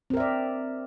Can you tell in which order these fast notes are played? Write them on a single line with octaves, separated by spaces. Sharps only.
C4 A#4 E5 D5